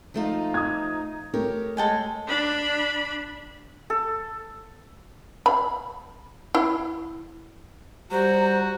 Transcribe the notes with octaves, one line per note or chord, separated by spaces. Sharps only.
F3 A3 D#4 F4
D#6 G#6
A3 G4 A#4 C#5
G#3 A4 G5 G#5
D4 B5
A4
B5
E4
G3 F#4 C5 A#5